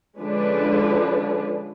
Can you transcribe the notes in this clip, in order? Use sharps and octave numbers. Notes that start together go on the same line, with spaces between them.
D3 F3 G#3 C#4 D4 B4